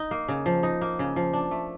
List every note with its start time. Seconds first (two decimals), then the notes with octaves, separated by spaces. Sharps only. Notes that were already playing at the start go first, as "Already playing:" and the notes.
Already playing: D#4
0.11 A#3
0.29 C#3
0.46 F3
0.63 D#4
0.81 A#3
0.99 C#3
1.16 F3
1.33 D4
1.51 A3